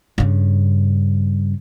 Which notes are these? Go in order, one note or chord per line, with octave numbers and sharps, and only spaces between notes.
G2 C#3